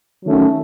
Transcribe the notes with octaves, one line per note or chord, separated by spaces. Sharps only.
D#3 F#3 A3 C#4